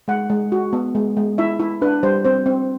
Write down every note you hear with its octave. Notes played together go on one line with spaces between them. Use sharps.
G#3 F#5
G#3
F#4
B3
G#3
G#3
E4 E5
E4
D4 B4
G3 C5
C4 C5
C4